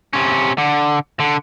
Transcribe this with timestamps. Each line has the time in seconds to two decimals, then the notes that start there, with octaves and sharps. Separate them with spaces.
0.13 C3 C#4
0.58 D3
1.20 D3